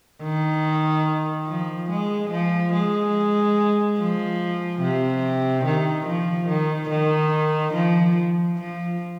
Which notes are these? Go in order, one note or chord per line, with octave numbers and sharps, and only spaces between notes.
D#3
F3
G#3
F3
G#3
F3
C3
D#3
F3
D#3
D#3
F3
F3